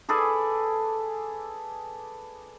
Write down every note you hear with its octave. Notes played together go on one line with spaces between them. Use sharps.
G#4 A4 B4 D5